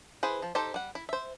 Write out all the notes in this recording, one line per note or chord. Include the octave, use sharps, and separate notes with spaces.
E4 G#4 B4 C5
F3
D#4 G4 A4 C5
G3 F#5
E4
C5 E5